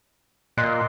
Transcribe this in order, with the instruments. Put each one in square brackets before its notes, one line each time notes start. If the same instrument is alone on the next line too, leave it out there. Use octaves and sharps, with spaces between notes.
[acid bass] A#2 [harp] D#5 C6 F#6